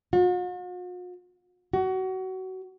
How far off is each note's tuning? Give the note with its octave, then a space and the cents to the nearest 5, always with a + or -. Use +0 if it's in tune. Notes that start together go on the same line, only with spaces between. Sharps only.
F#4 -45
F#4 +25